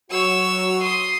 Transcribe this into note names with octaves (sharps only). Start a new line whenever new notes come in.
F#3 F#4 C#5 E6
C6 D#6